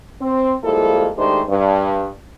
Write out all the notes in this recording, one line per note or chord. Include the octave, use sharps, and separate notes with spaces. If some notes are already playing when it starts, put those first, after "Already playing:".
C4
F3 G3 G#3 A#3 E4 A4
D#3 G#3 A3 D4 G4 C5
G2